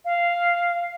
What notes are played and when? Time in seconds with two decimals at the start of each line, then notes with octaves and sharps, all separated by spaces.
0.05 F5